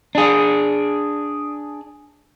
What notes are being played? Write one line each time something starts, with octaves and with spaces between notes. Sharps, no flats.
D4 G#4